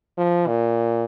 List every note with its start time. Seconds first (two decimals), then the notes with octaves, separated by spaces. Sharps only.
0.18 F3
0.47 A#2